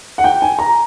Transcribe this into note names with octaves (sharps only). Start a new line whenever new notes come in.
F#5
G5
G#5
A#5